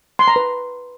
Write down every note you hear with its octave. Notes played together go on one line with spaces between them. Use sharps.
C6
A#5
B4